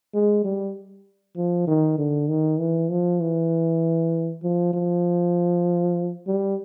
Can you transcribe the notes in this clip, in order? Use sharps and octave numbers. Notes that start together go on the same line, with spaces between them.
G#3
G3
F3
D#3
D3
D#3
E3
F3
E3
F3
F3
G3